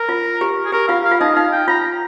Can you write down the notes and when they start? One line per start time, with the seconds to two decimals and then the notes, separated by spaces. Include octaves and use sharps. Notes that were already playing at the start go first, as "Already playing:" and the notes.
Already playing: A#4
0.09 F4
0.41 G4
0.65 G#4
0.72 G4 A#4
0.88 F4 F5
1.04 F5
1.11 F4
1.20 D#4 D#5
1.36 D#4 F5
1.52 G5
1.68 F4 A#5